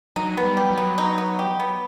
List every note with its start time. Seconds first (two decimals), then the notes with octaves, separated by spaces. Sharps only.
0.16 F#3 D#4
0.37 B3
0.43 G3
0.57 G4
0.71 F#3
0.78 B3
0.98 D#4
1.18 B3
1.39 G4
1.60 B3